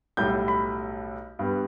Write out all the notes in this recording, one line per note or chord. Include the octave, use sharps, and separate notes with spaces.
B1 A2 G3 G6
B5
G2 G3 B3